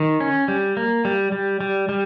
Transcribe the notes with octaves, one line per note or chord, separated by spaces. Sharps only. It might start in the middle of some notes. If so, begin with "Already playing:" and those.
Already playing: D#3
C#4
G3
A#3
G3
G3
G3
G3